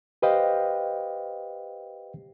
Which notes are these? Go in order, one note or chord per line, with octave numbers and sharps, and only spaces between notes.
G4 B4 C5 D#5 F5 G5